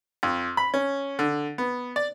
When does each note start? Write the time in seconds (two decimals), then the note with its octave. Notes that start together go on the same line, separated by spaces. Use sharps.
0.23 F2
0.57 B5
0.74 C#4
1.19 D3
1.58 B3
1.96 D5